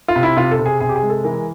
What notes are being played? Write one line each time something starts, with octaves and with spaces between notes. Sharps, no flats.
F4
C3
E4
C3 F4
A4
C3
G#4
C3 G#4
G4
G#4
G#3
A4
E3 A#4